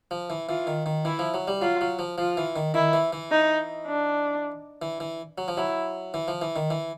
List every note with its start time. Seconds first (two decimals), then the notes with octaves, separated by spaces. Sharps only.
0.11 F3
0.30 E3
0.49 E3 F4
0.67 D#3
0.86 D#3
1.05 E3 E4
1.19 F3
1.34 F#3
1.48 G3
1.62 F#3 F4
1.81 F#3
1.99 F3
2.18 F3 F4
2.37 E3
2.56 D#3
2.74 D#3 E4
2.93 E3
3.13 E3
3.31 D#4
3.87 D4
4.82 E3
5.00 E3
5.38 F#3
5.48 F3
5.57 F#3 E4
6.14 E3
6.28 F3
6.42 E3
6.56 D#3
6.70 E3